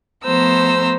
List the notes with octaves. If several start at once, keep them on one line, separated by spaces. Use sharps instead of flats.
F3 A3 B3 C5 A#5 E6